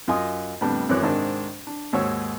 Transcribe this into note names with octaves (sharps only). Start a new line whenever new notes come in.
F#2 F4 D#5 G#5 C6 D#6
F2 A2 D3 G3 B3 D4
G#1 F#2 E3 C#5 D6 F#6
G#2 C3 D#3 C4 D4
D4
D#2 G#2 F#4 C#5 E6